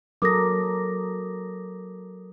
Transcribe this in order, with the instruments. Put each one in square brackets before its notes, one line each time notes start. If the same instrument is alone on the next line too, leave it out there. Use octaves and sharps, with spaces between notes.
[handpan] F#3 A4 A#4 [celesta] D6 D#6 A#6